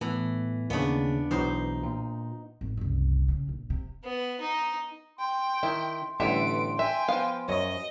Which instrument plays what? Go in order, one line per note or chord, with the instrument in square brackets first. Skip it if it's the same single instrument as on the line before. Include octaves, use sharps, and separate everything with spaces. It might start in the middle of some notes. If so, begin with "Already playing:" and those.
[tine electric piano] A2 B3 [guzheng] E3
[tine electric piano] D#2 C#3 [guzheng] B3 D4
[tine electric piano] B1 B2 E3 [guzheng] D#4 C5
[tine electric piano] A#2
[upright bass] G#1
F#1 C2
C#3
A#1
C3
[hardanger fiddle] B3
D#4
[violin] G5 [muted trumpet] C6
[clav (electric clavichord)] D#3 [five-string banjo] E4
[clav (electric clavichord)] A1 D3 G4 [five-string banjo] G3 B3 E5 [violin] D7
[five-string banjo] E5 [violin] G5 G#5
[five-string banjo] F3 F5 [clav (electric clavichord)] B3
[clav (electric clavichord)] F#2 C#5 [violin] D#5